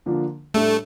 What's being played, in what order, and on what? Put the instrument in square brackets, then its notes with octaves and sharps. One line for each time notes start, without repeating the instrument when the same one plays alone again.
[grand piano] D3 F3 A#3 D4 F4
[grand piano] A2 G3 D4 A4 [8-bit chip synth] A3